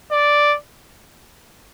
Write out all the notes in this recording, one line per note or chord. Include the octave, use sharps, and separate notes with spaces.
D5